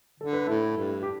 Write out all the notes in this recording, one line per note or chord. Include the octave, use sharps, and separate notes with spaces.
D3 A4
B4
A2 E4 A4
G2
G4